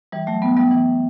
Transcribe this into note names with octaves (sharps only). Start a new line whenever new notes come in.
E3 G3
F#3 A3
G3 B3
G3 B3
E3